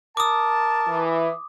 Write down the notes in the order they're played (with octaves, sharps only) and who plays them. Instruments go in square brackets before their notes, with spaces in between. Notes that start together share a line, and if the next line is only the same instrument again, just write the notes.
[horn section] A#4 A5 [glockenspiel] D6 D#6
[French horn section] E3